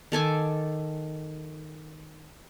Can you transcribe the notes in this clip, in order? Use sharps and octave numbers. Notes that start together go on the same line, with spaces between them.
D#3 A4 G#5 D6